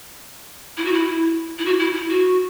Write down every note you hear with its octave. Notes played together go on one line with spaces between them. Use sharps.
E4
F#4
E4
E4
F#4
E4
E4
F#4